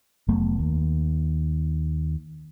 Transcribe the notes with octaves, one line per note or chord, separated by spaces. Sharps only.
F1 F#3 A3 B3
D#2